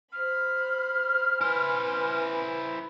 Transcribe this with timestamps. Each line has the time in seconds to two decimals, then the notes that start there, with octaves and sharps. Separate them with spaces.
0.13 C5 B5 F6
1.41 E4 B4 C5 G#5